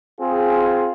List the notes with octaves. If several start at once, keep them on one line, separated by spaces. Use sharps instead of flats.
C4 F4 G#4